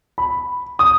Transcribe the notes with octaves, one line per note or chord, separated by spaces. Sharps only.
B5
D#6